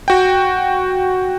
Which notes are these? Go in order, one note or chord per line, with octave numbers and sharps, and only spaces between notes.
F#4 G5